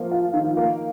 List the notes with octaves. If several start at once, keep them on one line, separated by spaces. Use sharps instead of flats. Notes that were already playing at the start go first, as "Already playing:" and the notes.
Already playing: F3 A#3 F4
F4
D#3
A#3